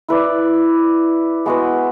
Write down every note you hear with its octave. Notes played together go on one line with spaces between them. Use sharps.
E4 B4 D5
G#3 B3 F#4 B4